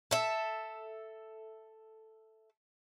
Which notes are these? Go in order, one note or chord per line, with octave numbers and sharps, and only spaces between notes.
A4 E5